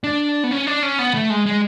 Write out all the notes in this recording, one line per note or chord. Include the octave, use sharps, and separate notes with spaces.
D4
B3
C#4
D4
C#4
B3
A3
G#3
G#3